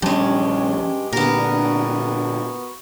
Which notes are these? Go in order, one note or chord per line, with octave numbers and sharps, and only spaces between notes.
A#1 G2 F3 G3 G#3 C#4 G4
A#2 D3 B3 A#4
D4
F#4